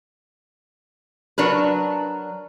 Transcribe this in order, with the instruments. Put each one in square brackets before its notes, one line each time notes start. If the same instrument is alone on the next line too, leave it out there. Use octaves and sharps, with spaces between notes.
[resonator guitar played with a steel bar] F#3 D4 A#4 B4